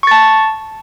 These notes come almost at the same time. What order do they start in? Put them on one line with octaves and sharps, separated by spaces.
C#6 A6 A5